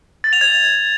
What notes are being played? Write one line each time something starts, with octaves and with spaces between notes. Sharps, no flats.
A6
F7
G#6